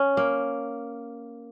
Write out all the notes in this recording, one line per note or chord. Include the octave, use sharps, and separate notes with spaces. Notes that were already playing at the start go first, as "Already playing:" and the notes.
Already playing: C#4
A#3